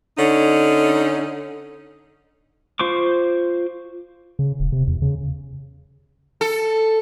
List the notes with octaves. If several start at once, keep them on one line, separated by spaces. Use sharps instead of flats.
D3 C#4 D#4
F4 C5 C#6 D6
C#3
D#1
C3
E2
C#3
A4